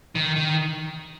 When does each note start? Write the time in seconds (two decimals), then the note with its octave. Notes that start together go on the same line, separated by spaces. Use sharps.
0.15 D#3
0.36 D#3